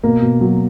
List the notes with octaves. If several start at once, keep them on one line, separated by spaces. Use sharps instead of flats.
B2 A#3
B2
F#3